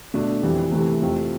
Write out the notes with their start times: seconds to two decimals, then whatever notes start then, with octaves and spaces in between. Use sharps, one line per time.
0.14 B2 A3 D4
0.42 F2 E3 G3
0.71 C3 E3 A3
1.01 F2 C3 F3 A3